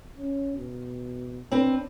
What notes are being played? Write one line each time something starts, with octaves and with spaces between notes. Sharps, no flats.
C#4
B2
C4 D4 B4